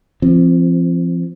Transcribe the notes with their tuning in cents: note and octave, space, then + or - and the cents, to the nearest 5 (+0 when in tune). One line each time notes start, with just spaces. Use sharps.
F3 -30 C4 +0